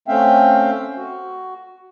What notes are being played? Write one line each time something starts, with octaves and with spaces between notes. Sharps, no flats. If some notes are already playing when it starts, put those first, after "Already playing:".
A3 C4 C#4 E5 F5 G5
F#4